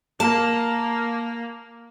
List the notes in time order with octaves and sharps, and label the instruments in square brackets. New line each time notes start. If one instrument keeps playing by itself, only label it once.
[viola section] A#3 [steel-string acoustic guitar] A5